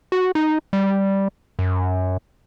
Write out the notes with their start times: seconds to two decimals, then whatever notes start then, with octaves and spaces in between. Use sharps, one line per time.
0.12 F#4
0.35 D#4
0.73 G3
1.59 F#2